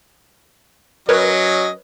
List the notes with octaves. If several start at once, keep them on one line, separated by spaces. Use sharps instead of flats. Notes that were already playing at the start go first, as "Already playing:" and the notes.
F#3 C#4 A#4 B4 C#5 D#5